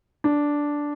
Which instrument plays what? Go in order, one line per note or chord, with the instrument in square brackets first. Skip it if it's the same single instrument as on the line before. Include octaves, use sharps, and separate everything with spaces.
[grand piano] D4